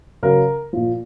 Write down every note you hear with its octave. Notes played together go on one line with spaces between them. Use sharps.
C#3 F#3 A#4
A#2 F3